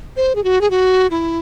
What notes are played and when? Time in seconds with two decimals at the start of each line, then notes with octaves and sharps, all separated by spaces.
0.17 C5
0.35 G#4
0.44 F#4
0.61 G#4
0.71 F#4
1.11 E4